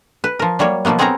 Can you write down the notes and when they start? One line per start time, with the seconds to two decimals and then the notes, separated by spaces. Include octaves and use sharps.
0.24 B4
0.39 F3 A#4
0.59 F#3 G3 A#3 C#5
0.85 B2 F3 F#3 A#3 B3
0.99 B3 C4 G#4 A#4 C#5 A#5